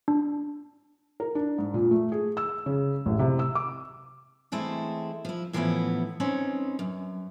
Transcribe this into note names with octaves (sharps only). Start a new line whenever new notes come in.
D4
A#4
D4
G#2
A#2
A3
G#4
E6
C#3
A1
C3
E6
D6
E3 G#3 A3 C4 E4
F3 E4
A2 E3 F3 B3 C#4 E4
C4 C#4 D#4 B4
F#2